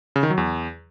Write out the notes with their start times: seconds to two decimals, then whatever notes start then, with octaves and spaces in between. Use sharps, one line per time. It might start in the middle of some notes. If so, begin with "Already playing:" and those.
0.16 C#3
0.23 D#3
0.30 F#3
0.37 E2